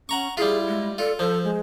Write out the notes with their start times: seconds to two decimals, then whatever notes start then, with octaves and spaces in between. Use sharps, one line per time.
0.09 C#4 F#5 A#5 C#6
0.37 G3 E4 F4 G#4
0.68 G#3
0.98 F4 A4 D5
1.19 F3 A4 C5
1.44 G#3